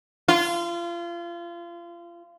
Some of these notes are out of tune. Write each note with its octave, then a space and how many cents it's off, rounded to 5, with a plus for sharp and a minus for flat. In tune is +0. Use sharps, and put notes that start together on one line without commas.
F4 -30